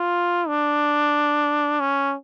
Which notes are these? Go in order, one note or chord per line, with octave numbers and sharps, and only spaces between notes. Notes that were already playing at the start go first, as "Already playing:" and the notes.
Already playing: F4
D4
C#4